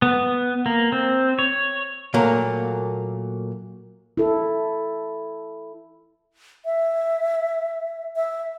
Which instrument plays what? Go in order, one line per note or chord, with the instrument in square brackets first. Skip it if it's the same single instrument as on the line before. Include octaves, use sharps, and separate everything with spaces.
[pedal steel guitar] B3
A#3
C4
C#5
[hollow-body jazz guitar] A#2 F#3 A3 A#3
[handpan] E4 A4
[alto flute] E5
E5